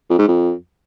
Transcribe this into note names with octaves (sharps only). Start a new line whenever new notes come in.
F2
G#2
F2